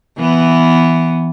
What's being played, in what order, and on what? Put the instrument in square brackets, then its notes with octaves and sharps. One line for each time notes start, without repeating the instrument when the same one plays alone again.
[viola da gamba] E3 B3